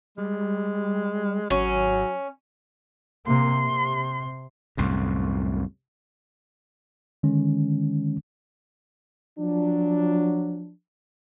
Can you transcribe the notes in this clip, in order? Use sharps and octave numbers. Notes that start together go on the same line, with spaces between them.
G3 G#3
G#1 F#3 C#4
C3 A#3 C6
C3
C2 F#2 A2
D3 D#3 G#3 C#4
F3 F#3 D4